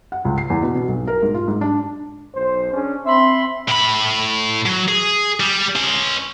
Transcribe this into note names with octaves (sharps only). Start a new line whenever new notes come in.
F#5
C#2
C7
E2
B2
B2
B1
A#4
G#2
F4
G#2
D4
B1 C5
C#4 D4 G#4
C4 E5 B5 C6
A2 B5
F#3
G#4
G3
C#4 C6